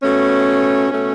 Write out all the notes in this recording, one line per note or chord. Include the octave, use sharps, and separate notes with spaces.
B2 A3 C#4
B2 A3 C#4